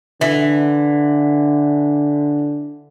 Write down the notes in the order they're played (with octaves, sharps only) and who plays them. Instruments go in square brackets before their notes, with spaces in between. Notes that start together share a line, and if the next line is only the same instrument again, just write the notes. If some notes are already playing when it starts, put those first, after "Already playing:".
[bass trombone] D3 [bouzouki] E3